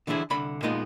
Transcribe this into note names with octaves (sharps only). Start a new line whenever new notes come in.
D3 E3 D4 E4 G#4 C5
C2 D3 B5
A#2 G#3 A#3 B3 D#4 F4